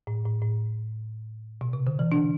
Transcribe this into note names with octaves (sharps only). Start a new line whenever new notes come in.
A2
A2
A2
B2
C3
D3
E3
D4